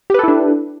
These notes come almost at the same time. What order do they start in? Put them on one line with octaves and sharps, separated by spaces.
G4 B4 A4 E4 D4